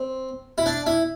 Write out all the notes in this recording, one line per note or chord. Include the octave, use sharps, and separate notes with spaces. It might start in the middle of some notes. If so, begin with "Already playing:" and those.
Already playing: C4
E4
D4
E4